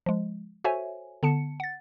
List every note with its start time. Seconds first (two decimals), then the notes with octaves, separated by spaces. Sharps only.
0.06 F3 G#3
0.64 F#4 A4 C5 C#5 E5 G#5
1.23 D3 B3 A5 C#7
1.60 F#5 A6